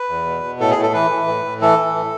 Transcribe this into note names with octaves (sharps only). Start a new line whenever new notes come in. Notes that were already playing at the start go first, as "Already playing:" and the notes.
Already playing: B4
E2
B2
B2
A2 A4
G#4
A2
A4
E3 B4
E3
A2
A2
E3 A4
E3
A2